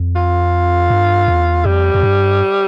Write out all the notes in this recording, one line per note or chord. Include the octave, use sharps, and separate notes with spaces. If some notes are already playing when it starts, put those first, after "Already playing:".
Already playing: F2
F4
G2
E2
F2 G3
F2
G2